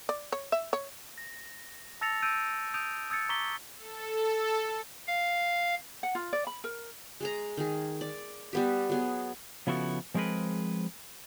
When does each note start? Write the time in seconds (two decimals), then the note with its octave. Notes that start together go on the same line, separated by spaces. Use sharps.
0.09 D5
0.32 C#5
0.52 E5
0.73 C#5
1.18 A#6
2.01 A5 E6 A6 A#6 C#7 F7
2.22 E6 G6 D7 D#7
2.74 D#6 G6 D7 D#7 F7
3.10 D#6 E6 G#6 A6 C#7
3.29 A#5 C#6 D6 A6 B6 G7
3.76 A4
5.07 F5
6.03 F#5
6.15 F4
6.33 D5
6.47 B5
6.64 A#4
7.21 G#3 G#4 A#5
7.57 D#3 G#4
8.01 D5
8.53 G3 B3 G4
8.90 F#3 B3 G#4
9.67 C#3 F3 B3 E4 F#4 A4
10.14 F3 G#3 C4 G#4 A#4 B4